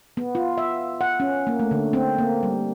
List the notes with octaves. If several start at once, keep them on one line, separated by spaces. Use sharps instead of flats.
B3
F4
E5
F#5
C#4
A#3
A3
D3
C4
A#3
G3